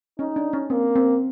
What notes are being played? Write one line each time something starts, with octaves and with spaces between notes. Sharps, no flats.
C#4 D#4
D4
C#4
A#3 C4
C4